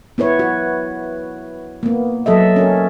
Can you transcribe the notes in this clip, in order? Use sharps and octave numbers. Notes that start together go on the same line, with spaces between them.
B3 E4 B4 C#5
F#4
A#3 B3
F#3 A4 D#5 E5
C#4 A#4